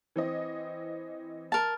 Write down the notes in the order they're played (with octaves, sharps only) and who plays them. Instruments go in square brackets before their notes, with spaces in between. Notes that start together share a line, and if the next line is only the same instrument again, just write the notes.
[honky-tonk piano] E3 C4 D#5
[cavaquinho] A#4 A5